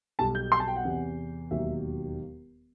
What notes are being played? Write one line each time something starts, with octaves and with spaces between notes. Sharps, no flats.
B1 B2 G3 A5
G6
C6
A5
G5
F#5
E2 C3 E3
E1 D#2 D#3 F#3 E5